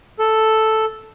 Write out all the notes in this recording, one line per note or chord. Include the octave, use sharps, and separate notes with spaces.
A4